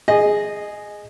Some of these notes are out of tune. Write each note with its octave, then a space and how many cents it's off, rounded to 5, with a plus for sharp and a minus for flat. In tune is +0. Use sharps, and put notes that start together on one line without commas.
G#4 +0 D#5 -15